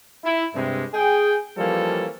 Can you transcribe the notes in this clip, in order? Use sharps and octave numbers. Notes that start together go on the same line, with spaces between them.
E4
G2 C3 G#3
G#4 G5
E3 F3 G3 A#3 C#4 A4